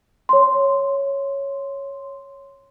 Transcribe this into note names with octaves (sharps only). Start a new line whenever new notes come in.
C#5 C6